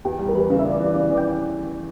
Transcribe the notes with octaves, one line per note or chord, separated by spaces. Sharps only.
E2 G4
G3
A#4
E3 B4
C#3
E5
C#3 D5
E3
C#3
E3
G5